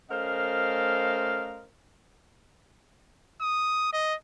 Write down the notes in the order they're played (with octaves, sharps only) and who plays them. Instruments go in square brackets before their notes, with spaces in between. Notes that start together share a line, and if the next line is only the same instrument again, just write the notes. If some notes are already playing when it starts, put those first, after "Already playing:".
[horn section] A3 C#4 A#4 C5 D#5 F5
[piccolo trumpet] D#6
D#5